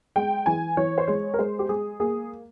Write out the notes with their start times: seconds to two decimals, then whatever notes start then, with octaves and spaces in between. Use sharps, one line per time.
0.16 G#3 G5
0.46 E3 G#5
0.77 E3 C#5
0.98 C5
1.08 G#3 C#5
1.34 A#4
1.39 G#3 C5
1.59 G4
1.69 G#3 G#4
2.00 A#3 G#4